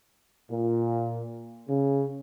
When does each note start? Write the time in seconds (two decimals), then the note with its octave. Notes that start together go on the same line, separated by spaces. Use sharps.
0.51 A#2
1.69 C#3